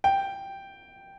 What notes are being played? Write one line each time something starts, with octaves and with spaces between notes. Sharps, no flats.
G5